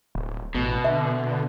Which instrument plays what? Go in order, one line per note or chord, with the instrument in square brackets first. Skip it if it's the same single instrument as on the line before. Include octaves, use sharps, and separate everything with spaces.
[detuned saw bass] D1
[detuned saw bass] A1 [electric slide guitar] B2
[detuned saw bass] D3 [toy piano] E5